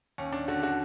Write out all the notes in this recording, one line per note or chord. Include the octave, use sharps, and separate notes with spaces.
D#2 C#4
D4
D3 F#4
F#4